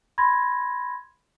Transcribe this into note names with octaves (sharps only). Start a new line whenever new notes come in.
B5 C6 G#6 A#6